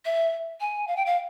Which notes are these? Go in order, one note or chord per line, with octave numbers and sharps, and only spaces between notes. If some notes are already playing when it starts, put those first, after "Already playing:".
E5
G#5
F5
G5
F5